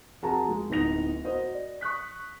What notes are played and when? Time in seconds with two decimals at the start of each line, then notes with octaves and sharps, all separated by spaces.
0.22 F2 F#4 G#4 A#4 A5 A#5
0.48 G#3
0.70 D1 B3 D#4 A#6 F7
1.24 F#4 A#4 C5 D#5
1.54 D5
1.81 C#6 D#6 F#6 B6